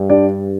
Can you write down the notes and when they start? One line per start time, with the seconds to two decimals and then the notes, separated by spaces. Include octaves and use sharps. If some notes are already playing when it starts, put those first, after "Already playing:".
Already playing: G2
0.10 D4 G4 D5